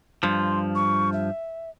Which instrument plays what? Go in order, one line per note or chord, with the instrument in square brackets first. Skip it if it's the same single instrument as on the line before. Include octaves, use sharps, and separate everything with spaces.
[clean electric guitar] G2 F3 [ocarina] C6
[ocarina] C#6
E5